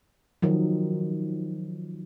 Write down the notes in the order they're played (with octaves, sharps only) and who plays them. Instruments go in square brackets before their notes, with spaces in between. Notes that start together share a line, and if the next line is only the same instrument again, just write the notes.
[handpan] D#3 F3 F#3